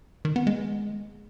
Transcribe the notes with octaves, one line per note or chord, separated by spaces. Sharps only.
D#3
B3
G#3